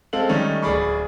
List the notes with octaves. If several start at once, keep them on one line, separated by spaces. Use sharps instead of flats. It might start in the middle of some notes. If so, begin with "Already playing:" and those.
G#3 C4 A4 F5 F#7
D#3 G3 A3 C#4 D#4
D1 C#3 G#4 D5 B5 C#6